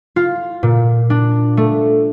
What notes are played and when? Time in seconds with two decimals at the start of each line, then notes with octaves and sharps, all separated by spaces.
0.16 F4
0.63 A#2
1.10 D4
1.57 A3